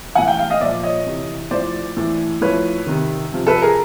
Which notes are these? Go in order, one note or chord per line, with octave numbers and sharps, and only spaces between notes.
A2 E3 F#5 G#5
F5 G5
F5 G5
D#5 F5
A#2 F3 D5 E5
C#5 D#5
C3 E3
A2 F3 C5 D5
A2 E3
A2 F3 B4 C#5
C3 D#3
C3 F3
A4 B4
G#4 A#4